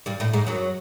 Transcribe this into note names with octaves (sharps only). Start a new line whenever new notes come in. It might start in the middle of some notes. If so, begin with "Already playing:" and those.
G2 G3
A2 A3
G#2 G#3
F#2 F#3